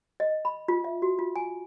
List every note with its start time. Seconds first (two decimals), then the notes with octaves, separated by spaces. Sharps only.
0.20 D#5
0.45 B5
0.68 F4
0.84 E5
1.02 F#4
1.19 F4
1.36 G#5